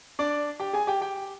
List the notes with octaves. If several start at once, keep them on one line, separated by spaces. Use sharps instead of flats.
D4 D5
G4 G5
G#4 G#5
G4 G5
G4 G5